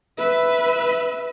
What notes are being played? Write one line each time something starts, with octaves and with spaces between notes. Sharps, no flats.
B4 E5